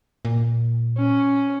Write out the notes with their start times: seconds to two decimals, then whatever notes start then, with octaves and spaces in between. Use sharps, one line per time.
0.25 A#2
0.97 C#4